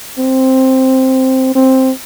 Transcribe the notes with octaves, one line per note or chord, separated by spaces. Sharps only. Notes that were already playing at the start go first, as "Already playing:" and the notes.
C4
C4